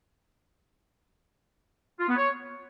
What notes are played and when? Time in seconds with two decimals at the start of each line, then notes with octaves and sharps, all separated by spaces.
2.00 F4
2.08 B3
2.16 C#5